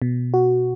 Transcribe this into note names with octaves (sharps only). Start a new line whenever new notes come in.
B2
F#4